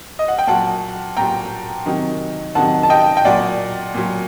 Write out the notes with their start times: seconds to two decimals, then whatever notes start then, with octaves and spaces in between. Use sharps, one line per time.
0.19 D#5
0.28 F#5
0.39 G5
0.47 A#2 F#3 F#5 A5
1.17 A#2 F#3 G5 A#5
1.86 C3 D#3 F#3
2.55 C3 D#3 F#3 F#5 A5
2.83 A5
2.90 D#5 G5
3.17 G5
3.25 A#2 F#3 D5 F#5
3.94 A#2 F#3